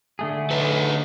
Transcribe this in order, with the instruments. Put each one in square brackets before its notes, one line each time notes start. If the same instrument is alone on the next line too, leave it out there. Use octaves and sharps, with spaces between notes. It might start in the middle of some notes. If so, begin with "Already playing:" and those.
[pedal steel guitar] D3 A3 G#4
[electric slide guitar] A4 B4 D#5